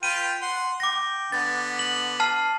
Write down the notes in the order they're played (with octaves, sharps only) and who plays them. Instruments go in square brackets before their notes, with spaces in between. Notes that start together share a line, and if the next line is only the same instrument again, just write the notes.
[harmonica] F4 B4 G5 [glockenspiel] D#7
[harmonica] F#5 C6
[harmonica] G5 [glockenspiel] D6 A#6
[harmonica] D3 B3 [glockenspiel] A6
[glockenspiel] F#7
A5 F6 C7